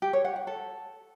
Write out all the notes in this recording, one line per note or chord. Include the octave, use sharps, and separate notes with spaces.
G4
C#5
F#5
F#5
A4